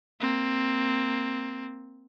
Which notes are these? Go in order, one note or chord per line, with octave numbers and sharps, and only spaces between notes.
A#3 C4